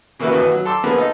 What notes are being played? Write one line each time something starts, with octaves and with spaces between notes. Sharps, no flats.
C#3 E3 A#3 E4 F#4 B4
A#1 D#2 E3 F#4 B4
F#3
A4 A5 C6 D6 E6
D3 F3 A#3 B3 G#4 B4
D#4 F4 A4 D#5